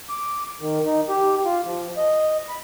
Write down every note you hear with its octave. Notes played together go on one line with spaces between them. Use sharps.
D6
D#3
D#4
G4
F4
F3
D#5
B5